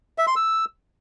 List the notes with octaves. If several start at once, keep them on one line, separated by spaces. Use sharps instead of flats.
E5
C6
E6